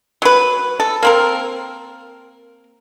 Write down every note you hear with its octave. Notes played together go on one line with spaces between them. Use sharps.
F#3 B4
A4
A#3 C4 A#4